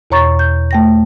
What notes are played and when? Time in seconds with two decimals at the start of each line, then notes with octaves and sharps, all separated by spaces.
0.11 E2 B2 C#5 A#5 C#6 A6
0.39 G6
0.71 A3 G5 A#6